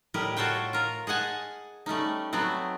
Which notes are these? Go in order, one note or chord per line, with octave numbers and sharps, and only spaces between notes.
A2 G3 G4 A#4 D#5
F4 F#4 A4 C5 C#5 G5
F4 A#4
G#4 D#5 F#5 G#5 A5
G3 A3 C#4 D#4
F#3 A3 B3 C4